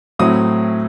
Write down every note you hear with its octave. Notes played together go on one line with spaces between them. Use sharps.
A2 F#3 A3 C4 D#6